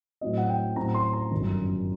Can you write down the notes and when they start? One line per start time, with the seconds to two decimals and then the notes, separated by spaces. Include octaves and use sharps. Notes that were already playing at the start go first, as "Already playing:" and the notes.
0.21 A2 F#3 C4 D#5
0.37 F#5
0.49 G5
0.76 A2 F#3 C4 A#5
0.94 C6
1.13 A#5
1.31 G1 F#2 D#3